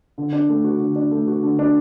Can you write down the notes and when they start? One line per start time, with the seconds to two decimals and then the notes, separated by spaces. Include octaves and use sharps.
0.18 D3
0.33 D4
0.49 A3
0.64 F#4
0.80 D3
0.96 D4
1.11 A3
1.28 F#4
1.43 D3
1.59 D4